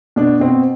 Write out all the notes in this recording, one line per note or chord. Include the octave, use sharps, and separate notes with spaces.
B2 D4
B2 C4